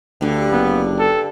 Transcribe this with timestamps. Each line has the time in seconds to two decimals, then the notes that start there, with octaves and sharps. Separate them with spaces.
0.21 D2 G2 D3
0.51 F#1 B3
0.99 A4